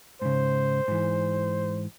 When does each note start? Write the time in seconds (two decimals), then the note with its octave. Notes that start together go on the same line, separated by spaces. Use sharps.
0.22 G#2 C#3 C5
0.88 G#2 E3